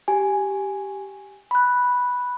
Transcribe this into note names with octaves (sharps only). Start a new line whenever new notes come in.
G4 G#5
B5 F#6